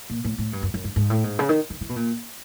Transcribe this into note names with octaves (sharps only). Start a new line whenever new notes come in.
A#2
A2
A2
G2
F#2
F#2
G2
G#2
A2
G#2
C#3
D#3
D#3
E3
B2
A#2